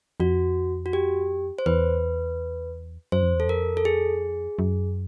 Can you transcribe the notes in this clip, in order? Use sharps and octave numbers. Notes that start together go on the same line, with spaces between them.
F2 F#4
F#4
G4
C5
E2 B4
F#2 C5
F2
E2
A4
F2 A#4
A4
G#4
F#2